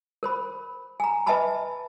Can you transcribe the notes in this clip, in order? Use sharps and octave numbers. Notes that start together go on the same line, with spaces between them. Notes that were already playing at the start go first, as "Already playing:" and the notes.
A#4 C5 B5
G#5 A#5
B4 D#5 E5 G#5 A5 B5